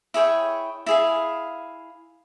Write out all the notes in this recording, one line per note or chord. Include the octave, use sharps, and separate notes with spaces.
E4 G#4 C#5 G5
E4 G#4 F5